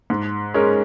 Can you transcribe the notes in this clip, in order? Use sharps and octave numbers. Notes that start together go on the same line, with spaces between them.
G#2
G#3 C#4 A#4